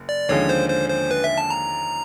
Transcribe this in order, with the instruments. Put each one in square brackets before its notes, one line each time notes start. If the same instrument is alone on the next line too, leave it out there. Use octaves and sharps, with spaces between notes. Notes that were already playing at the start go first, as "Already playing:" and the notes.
Already playing: [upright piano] F#1
[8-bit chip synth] D5
[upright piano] D#2 D3 F3 G#3 C#4 [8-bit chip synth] C#5
[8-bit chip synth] C5
C5
C5
B4
E5
A5
A#5